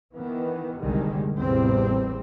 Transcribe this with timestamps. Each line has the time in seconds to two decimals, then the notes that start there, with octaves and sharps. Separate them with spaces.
0.15 D#3 E3 B3
0.80 F#1 C2 D3 D#3 G3 G#3
1.36 A1 E2 A2 C3 G3 C4